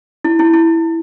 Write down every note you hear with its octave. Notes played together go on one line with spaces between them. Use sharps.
E4
E4
E4